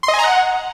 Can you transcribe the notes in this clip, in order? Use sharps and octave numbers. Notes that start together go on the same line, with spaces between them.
C6
D#5
G#5
A#5
F#5